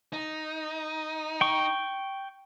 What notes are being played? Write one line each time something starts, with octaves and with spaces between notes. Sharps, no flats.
D#4
G5 C#6